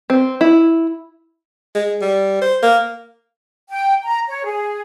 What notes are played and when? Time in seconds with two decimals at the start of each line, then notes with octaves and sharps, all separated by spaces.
0.10 C4
0.41 E4
1.75 G#3
2.01 G3
2.41 C5
2.62 A#3
3.70 G5
4.04 A#5
4.28 C#5
4.44 G#4